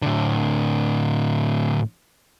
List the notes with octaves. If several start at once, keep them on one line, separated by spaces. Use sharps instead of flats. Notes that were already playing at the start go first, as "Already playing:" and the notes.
A2 D3